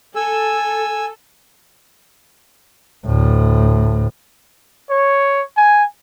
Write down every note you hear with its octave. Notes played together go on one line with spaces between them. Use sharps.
A4 G#5 E6
D2 A2
C#5
G#5